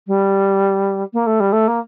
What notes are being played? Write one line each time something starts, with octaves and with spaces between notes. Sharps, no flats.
G3
A#3
A3
G3
A3
A#3